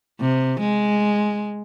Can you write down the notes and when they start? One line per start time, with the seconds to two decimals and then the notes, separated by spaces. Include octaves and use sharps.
0.21 C3
0.60 G#3